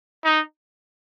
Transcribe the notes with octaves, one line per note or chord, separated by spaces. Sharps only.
D#4